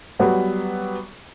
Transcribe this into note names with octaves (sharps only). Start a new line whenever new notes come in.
F#3 G3 B3